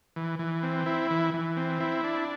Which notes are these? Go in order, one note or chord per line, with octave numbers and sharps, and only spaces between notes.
E3
E3
C4
E4
E3
E3
C4
E4
D4